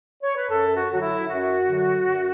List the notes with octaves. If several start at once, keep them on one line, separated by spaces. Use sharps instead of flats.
C#5
B4
F#2 A4
F#4
D3 F#3 F#4
E4
F#2 F#4
D3 F#3
F#2